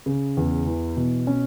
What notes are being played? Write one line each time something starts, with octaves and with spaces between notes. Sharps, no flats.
C#3
E2
E3
B2
C#4